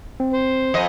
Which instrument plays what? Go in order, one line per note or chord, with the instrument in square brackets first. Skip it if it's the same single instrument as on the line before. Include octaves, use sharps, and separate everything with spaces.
[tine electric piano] C4
[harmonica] C5
[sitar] F2 D#5